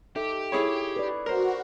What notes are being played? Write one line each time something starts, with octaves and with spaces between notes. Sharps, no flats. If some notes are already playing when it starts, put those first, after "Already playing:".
D#4 G4 A4 E5
E4 G#4 C#5
B4 D5
F#4 A#4 C5